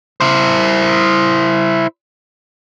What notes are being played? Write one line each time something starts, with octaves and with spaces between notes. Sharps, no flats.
E4 C5